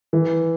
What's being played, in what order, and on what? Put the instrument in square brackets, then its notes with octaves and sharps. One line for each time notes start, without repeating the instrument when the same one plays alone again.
[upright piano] E3